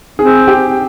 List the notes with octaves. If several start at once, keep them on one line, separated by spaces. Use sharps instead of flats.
C4 G#4
G4